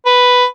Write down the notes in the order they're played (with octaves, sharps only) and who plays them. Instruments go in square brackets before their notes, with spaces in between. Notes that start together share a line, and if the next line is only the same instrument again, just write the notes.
[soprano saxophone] B4